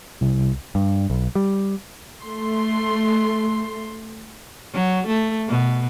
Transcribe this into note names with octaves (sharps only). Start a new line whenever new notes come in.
C2
G2
B1
G3
A3 C6
F#3
A3
B2